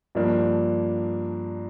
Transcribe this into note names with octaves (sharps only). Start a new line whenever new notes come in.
G2 F3 A#3 D4 G4